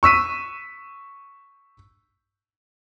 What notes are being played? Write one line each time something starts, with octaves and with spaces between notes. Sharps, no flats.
C#6 E6 B6 D#7